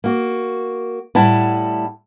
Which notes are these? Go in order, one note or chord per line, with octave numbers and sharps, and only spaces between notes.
A#3 F#4
A2 G3 E4 F#5 A5